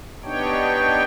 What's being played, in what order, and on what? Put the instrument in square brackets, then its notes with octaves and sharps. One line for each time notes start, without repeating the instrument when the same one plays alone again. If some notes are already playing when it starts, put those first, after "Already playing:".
[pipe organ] B3 D4 D#4 G4 C#5 G5